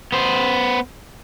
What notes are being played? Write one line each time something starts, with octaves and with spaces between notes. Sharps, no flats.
B3 C5